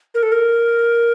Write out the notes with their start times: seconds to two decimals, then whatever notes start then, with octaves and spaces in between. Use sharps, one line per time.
0.14 A#4
0.23 A4
0.32 A#4